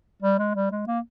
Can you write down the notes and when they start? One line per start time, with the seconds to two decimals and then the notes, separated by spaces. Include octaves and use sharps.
0.22 G3
0.39 G#3
0.55 G3
0.71 G#3
0.87 A#3